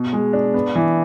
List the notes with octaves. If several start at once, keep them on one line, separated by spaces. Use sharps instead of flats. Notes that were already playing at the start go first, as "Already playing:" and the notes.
Already playing: B2
G#3
D4
B3
E3